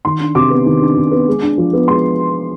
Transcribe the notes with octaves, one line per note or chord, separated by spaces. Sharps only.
D#3 C6
D4
C3 D6
B3
D#3
D4
C3
B3
G#3
D4
F3
B3
G#3 C6